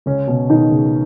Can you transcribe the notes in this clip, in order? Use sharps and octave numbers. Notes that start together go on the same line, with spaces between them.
C#2 C#3 C#4
B2
B2 D#3 D#4
C#2